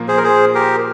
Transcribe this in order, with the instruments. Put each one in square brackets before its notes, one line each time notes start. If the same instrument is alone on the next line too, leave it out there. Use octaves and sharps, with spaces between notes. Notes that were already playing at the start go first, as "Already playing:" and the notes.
Already playing: [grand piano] A#2 F3 A#3
[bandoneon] G#4 C5
A#4
G#4 C5
G4 A#4